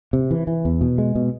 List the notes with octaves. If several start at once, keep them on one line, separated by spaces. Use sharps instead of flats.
C3
E3
E3
E2
B2
G#3
B2